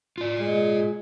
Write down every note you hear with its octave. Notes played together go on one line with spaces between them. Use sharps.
F4 D5
G#3